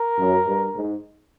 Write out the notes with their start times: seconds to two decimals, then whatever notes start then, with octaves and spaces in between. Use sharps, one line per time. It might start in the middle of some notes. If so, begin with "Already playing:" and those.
Already playing: A#4
0.19 F#2
0.47 G2
0.75 G#2